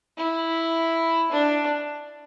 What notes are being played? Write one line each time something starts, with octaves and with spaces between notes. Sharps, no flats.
E4
D4